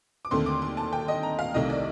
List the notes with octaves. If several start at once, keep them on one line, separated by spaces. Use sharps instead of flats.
D6
D#2 D3 A3 C4 C6
D6
C6
A5
G5
D#5
A#5
F5
C2 C3 D#3 A3 C4 D#5
D5